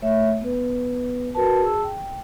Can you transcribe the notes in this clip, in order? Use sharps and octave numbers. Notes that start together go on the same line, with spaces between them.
A3 C#5 E5
B3 B4
F#4 A#4 B4 A5
G#4 A5 E6
G5